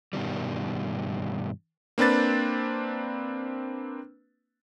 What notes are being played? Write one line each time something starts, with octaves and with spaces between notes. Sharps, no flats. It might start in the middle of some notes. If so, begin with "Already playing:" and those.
G2 B2 D#3 G3
A#3 C4 D4 B4 A6